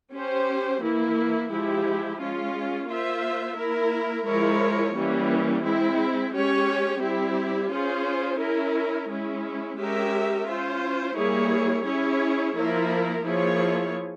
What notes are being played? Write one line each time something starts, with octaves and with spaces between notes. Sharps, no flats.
C#4 G4 C5
E3 A#3 E4
F3 G#3 E4 G4
G#3 C#4 F4
A#3 F4 C5 E5
A#3 E4 A#4
F3 G#3 E4 A#4 C#5
E3 G3 A#3 C#4
G#3 C4 E4
G#3 C#4 G4 C#5
G3 C4 E4 G4
C#4 F4 G#4 C5
C#4 E4 A#4
G#3 C#4 E4
G#3 C#4 G4 A#4 E5
C#4 F4 C5
G3 A#3 E4 G#4 C#5
C#4 E4 G#4 C#5
F3 A#3 E4 A#4
F3 A#3 E4 G#4 C#5